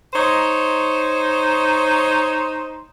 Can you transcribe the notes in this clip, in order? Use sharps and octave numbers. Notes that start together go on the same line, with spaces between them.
D#4 C5 C#5